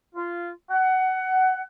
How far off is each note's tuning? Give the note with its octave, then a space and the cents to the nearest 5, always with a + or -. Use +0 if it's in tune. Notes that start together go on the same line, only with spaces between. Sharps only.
F4 -15
F#5 +20